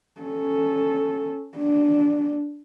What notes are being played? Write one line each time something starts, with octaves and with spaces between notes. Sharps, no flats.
C#4 A4
D4